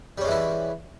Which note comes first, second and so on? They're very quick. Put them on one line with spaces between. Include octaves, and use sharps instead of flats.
G3 C#4 G#3 E3 E4